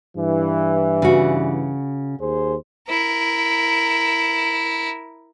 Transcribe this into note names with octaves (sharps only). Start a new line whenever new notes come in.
G2 E3
C#3 F#4
D#2 G#4 C5
E4 A#4